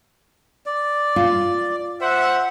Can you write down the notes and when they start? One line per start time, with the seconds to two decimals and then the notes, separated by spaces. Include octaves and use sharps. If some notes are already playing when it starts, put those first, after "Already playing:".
0.66 D5
1.16 F4
2.01 C5 E5 F#5